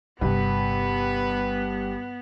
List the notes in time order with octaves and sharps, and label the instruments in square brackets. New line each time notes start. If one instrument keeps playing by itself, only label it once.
[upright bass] G1 C3 [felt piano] G2 [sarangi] B3 [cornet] B4